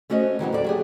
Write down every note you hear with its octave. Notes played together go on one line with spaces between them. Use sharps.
A3 C#4 F#4 C5 D#5
D#3 E3 F#3 B3
D#2 A4 D5
F#3 G4 G#4